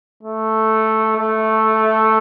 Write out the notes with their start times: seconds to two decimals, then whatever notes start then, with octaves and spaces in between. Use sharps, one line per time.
0.23 A3
1.17 A3